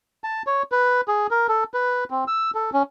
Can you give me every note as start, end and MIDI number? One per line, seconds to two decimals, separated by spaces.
0.24 0.42 81
0.47 0.63 73
0.72 1.01 71
1.08 1.27 68
1.31 1.47 70
1.48 1.64 69
1.74 2.04 71
2.10 2.24 60
2.27 2.51 88
2.55 2.70 69
2.73 2.83 61